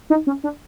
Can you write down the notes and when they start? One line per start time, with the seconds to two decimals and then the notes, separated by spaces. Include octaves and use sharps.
0.10 D#4
0.27 C#4
0.44 D4